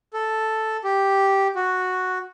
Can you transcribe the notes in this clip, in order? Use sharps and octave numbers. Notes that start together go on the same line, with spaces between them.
A4
G4
F#4